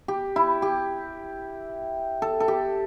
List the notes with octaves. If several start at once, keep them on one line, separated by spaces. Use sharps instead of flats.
G4
E4
G4
A4
A4
G4